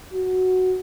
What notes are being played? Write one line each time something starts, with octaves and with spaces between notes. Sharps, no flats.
F#4